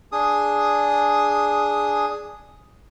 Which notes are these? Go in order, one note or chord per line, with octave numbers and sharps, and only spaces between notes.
D4 G#4 D#6